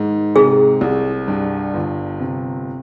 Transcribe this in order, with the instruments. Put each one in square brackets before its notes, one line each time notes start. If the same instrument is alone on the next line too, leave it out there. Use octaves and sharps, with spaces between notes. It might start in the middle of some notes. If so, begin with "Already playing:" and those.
Already playing: [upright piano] G#2 D#3
[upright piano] C3 [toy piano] G#4
[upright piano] C2
G2
G1
C3